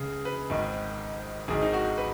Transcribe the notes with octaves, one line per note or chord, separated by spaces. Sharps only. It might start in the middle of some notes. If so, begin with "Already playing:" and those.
Already playing: C#2 C#3 G#4
B4
G#1 G#2 D#3
G#1 G#2 D#3 G#4
D#4
F#4
B4